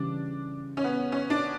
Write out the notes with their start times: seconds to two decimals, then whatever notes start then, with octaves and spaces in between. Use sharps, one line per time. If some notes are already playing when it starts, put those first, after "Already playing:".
Already playing: C#3 E3 G3 C#4 D4
0.77 C#4
0.84 B3
1.12 C#4
1.30 D4